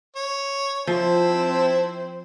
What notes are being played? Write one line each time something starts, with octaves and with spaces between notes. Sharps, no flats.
C#5
F3 C4 E4 C5 A5